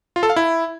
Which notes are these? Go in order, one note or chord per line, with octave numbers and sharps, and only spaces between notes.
F4
A4
F5
E4